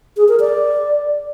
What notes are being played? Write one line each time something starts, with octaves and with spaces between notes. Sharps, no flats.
G#4
A#4
D5